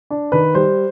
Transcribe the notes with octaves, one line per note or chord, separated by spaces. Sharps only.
D4
D#3 B4
G3 C5